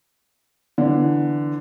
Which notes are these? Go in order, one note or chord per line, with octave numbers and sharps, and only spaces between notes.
D3 E3